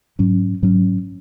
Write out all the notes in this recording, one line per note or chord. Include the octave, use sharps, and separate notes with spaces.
G#2 F#3 C#4
G#2 F#3 C#4